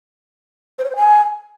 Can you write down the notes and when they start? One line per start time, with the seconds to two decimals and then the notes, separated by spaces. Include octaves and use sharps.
0.78 C5
0.84 C#5
0.90 C5
0.96 G#5